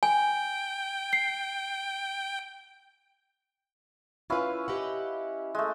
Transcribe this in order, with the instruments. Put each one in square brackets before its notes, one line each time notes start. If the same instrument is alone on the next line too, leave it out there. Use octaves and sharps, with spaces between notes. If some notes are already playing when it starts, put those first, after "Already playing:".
[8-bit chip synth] G5 [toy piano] G#5
[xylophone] C7
[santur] C#4 E4 F5 [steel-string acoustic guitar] F4 B4
[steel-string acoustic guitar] G4 D#5 F#5
[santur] G#3 A3